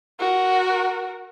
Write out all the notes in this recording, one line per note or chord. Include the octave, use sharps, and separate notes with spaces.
F#4 A#4